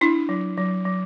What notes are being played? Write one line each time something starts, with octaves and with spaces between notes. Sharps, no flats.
D4 E4
F#3
F#3
F#3